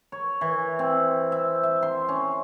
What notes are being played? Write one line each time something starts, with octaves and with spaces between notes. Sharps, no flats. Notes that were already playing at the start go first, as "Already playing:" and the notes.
C#5
E3
C4
E5
E5
C6
C#4